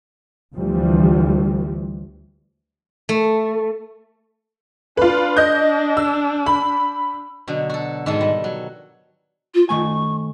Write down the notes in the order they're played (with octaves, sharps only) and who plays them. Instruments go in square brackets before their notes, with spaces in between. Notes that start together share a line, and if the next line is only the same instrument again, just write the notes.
[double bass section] D2 E3 F3 G3
[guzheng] A3
[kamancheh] D4 [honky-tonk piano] F4 B4
[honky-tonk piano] D#5 G6
E6
B5
[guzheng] B2 D3 F#3
F#4 A4
G#2 D#3 G#3 A4 D#5
G3
F#3
[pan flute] F4
[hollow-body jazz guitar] D#3 A3 G#5 [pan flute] C#6